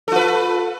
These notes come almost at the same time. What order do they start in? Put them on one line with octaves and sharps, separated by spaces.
A4 F4 B4